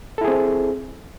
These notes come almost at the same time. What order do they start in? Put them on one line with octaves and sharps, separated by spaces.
A4 E4 G#4 C4